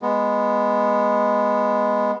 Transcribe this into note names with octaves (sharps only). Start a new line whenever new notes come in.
G#3 B3